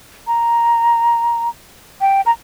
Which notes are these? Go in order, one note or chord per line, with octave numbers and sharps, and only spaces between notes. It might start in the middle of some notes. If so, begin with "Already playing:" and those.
A#5
G5
A#5